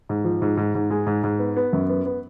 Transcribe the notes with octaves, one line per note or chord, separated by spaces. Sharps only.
G#2
F3
G#2
G#2
G#2
G#3
G#2
G#2
B3
B3
F#2
B3
B3